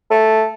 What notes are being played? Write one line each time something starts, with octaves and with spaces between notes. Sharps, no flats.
A3